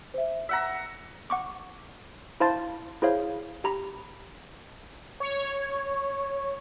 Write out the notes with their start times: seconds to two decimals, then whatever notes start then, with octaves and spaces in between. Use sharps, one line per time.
0.14 C5 E5
0.49 E5 F#5 A#5 B6
1.30 F#5 C#6 D6
2.40 E4 C5 F5 A5 C6 A6
3.02 E4 G#4 C5 C#5 F5
3.64 G4 A#5 B5
5.20 C#5